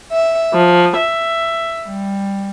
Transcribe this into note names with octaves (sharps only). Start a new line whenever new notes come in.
E5
F3
E5
G3